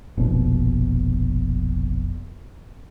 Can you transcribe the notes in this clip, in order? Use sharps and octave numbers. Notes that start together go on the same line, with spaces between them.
F1 A#1 B2